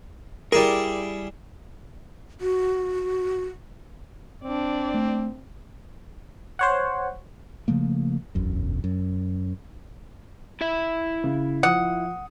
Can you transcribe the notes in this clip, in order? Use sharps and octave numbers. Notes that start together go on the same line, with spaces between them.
G3 E4 G#4 A#4 D5
F#4
C4 D4 D5
A3
C5 C#5 F#5
C#3 F3 A3 A#3
E1 B1 F#2
F#2
E4 E5
C#3
F3 F#5 D#6